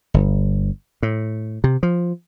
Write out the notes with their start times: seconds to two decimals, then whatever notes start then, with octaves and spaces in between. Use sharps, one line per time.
0.14 G1
1.03 A2
1.64 C3
1.83 F3